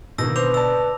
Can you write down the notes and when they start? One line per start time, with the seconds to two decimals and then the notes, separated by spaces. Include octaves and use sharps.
0.18 B2 D3 D#3 A#3 B3 E6 A#6
0.36 B4 C5 D6 F7
0.54 D5 A5 E6